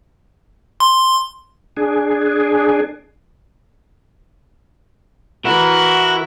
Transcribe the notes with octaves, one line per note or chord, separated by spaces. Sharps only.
C6
D4 G#4
E3 E4 F#4 A#4